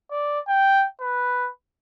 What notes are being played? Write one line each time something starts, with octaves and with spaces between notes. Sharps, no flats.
D5
G5
B4